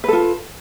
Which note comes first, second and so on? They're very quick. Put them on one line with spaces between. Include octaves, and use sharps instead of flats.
B4 A4 F4